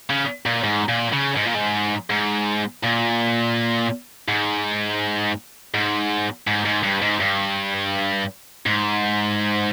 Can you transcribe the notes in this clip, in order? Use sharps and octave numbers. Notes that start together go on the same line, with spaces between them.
C#3
A#2
G#2
A#2
C#3
G#2
A#2
G#2
G#2
A#2
G#2
G#2
G#2
G#2
G2
G#2
G2
G#2